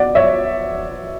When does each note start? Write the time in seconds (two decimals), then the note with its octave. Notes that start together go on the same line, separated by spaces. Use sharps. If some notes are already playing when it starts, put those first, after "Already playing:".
Already playing: B2 D5 F#5
0.15 C#5 E5